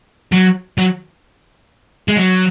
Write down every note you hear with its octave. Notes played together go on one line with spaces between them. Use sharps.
F#3
F#3
G#3
F#3